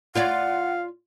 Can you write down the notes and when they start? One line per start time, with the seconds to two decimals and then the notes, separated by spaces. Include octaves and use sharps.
0.15 F4 C#5 D5 F5 F#5